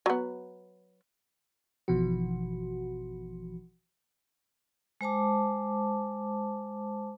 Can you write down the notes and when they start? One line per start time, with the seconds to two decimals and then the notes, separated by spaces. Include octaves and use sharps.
0.06 F#3 B3
1.88 G#1 B2 E3 F3 F#4
5.01 G#3 C5 A5 D6